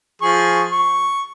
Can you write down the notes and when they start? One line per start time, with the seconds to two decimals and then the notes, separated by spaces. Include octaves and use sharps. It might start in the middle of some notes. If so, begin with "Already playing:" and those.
0.22 F3 G#4 C#6
0.73 C#6